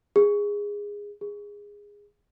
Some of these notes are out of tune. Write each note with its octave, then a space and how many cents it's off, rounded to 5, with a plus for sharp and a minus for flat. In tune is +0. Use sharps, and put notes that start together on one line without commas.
G#4 -15
G#4 -15